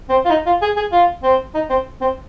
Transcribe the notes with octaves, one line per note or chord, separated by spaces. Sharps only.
C4
F4
D#4
F4
G#4
G#4
F4
C4
D#4
C4
C4